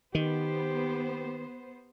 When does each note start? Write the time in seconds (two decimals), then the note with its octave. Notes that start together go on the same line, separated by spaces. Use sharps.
0.15 D#3 B3 G4 C5